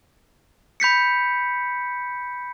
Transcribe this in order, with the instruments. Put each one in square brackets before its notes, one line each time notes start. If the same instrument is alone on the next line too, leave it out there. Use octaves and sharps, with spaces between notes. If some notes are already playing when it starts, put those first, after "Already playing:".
[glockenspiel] B5 G6 B6 C#7